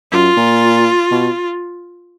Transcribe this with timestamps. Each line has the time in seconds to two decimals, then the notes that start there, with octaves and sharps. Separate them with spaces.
0.12 F#2 F4
0.37 A#2
1.11 B2